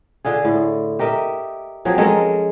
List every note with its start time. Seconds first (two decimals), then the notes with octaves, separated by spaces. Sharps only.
0.25 D3 F4 G#4
0.45 A2
0.99 G4 A#4 D#5 E5
1.85 F3 F#3 C4 G#4
1.98 G#3 C#4 A4 A#4